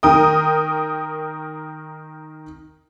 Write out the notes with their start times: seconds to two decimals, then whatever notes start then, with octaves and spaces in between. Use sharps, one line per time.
0.03 D#3 A#4 G5 D#6